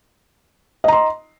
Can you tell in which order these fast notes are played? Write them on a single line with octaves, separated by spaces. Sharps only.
D#5 A#5 C6